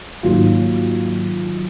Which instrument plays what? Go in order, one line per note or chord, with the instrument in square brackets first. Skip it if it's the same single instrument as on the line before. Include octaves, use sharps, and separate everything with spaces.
[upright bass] G#2 A#3 [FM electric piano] D#3 F#3 F4